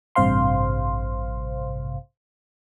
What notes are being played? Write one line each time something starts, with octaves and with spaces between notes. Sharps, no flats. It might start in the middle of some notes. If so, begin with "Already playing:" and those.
A1 G2 C3 C5 F5 C6